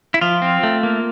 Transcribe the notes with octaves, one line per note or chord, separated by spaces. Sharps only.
E4
F3 F4
C4
A3
A#3